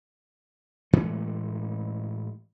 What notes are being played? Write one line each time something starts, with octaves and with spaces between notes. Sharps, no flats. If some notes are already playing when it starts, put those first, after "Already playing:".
A2 E3 G#3 A3